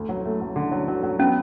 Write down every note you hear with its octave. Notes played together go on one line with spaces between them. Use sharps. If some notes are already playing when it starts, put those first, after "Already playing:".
Already playing: D2
F#3
A3
F#3
D3
F#3
F#3
F#3
B3 C#4